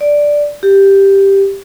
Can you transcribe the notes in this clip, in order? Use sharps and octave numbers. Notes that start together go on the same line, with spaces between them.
D5
G4